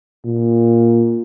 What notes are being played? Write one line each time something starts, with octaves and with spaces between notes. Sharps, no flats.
A#2